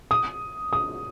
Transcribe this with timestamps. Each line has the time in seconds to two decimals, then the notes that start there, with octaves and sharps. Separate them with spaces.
0.11 D#6
0.73 D#6